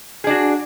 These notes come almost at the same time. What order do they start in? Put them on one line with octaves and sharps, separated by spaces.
G#4 D4 F#4